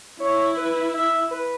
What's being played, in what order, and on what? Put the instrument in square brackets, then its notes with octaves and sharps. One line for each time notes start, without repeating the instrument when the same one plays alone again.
[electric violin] E4 [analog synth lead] C#5
[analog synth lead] B4
E5
B4